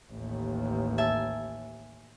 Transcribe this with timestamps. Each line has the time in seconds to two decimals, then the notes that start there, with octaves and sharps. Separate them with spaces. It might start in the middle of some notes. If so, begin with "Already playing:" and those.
0.11 A1 D#2
0.98 E5 G#5 A5